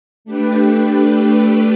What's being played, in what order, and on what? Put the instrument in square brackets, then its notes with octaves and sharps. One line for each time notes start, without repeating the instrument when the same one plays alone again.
[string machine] A3 D4 G4 B4